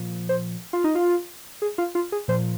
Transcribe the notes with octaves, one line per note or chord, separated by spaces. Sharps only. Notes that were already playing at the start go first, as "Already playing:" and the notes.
Already playing: A#2 F3
C5
F4
D#4
F4
G#4
F4
F4
G#4
A#2 F3 C5